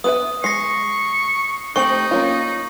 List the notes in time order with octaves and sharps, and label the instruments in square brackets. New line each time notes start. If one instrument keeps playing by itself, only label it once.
[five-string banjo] B3 B4 E5 [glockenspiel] D#6
[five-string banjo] G#3 [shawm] C#6 [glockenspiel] A#6 C7
[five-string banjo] A3 C4 G4 [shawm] D#4 [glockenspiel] C#6 F#7
[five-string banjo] A#3 C#4 F4